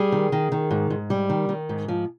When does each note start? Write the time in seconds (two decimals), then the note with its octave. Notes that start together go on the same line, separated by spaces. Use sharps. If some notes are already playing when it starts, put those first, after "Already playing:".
Already playing: G3 G#4
0.12 D#3
0.32 D#3
0.52 D#3
0.71 G#2
0.90 G#2
1.10 G3
1.30 D#3
1.49 D#3
1.69 G#2
1.88 F3